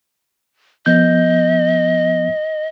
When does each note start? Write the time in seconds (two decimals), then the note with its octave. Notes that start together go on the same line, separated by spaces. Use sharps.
0.86 F3 B3 D#5 G6